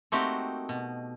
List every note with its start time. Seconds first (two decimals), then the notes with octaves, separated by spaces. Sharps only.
0.12 A3 A#3 C4 D#4 F#4 G4
0.69 B2